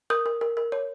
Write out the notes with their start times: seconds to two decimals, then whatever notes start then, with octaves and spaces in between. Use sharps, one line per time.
0.10 A#4 D#6 G6
0.26 A#4
0.41 A#4
0.57 A#4
0.72 C#5